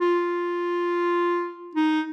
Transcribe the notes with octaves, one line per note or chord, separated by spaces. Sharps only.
F4
D#4